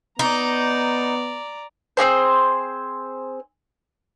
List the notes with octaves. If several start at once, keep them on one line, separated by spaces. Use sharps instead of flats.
B3 D#4 D5 A#5
C4 D#4 G#4 C5